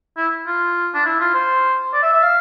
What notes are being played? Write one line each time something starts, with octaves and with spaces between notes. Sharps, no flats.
E4
F4
D4
E4
F4
C5
D5
E5
E5
F5